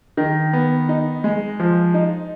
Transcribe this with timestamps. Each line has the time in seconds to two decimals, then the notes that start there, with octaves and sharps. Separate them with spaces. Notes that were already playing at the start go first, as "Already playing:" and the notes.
0.17 D#3
0.53 B3
0.89 D#4
1.24 G#3
1.60 F3
1.94 D#4